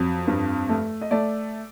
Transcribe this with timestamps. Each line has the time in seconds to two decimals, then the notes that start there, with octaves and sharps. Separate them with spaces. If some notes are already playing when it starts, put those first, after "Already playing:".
Already playing: F2 F#3
0.28 G2
0.69 A3
1.01 D#5
1.11 A3 D5